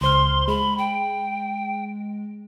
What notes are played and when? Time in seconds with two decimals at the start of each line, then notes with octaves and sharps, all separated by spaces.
0.01 C#2 C5 C6 F6
0.48 G#3 B5
0.78 G5